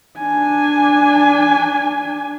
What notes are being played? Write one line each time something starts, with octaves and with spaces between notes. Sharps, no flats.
D4 G#5